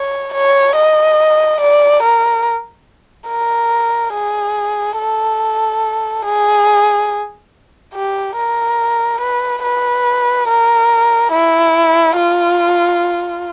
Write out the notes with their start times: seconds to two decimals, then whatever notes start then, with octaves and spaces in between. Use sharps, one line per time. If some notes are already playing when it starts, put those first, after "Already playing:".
Already playing: C#5
0.34 C#5
0.76 D#5
1.61 D5
2.02 A#4
3.29 A#4
4.14 G#4
4.98 A4
6.25 G#4
7.94 G4
8.37 A#4
9.21 B4
9.63 B4
10.48 A#4
11.32 E4
12.16 F4